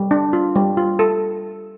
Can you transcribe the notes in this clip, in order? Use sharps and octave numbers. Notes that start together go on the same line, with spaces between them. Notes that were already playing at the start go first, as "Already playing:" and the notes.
Already playing: G3
D4
F4
G3
F4
A4